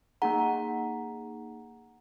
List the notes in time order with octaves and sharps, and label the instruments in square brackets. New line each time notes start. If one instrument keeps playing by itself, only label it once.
[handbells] A#3 D#4 G#4 F#5 A#5